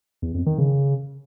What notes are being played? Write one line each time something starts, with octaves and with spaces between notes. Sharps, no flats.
E2
F2
D#3
C#3